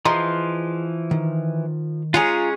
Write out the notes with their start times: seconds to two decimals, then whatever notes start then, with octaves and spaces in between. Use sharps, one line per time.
0.05 E3 F3 G#4 D#5 A#5 C6
1.11 D#3
2.14 G#3 C#4 F4 G#4 A#5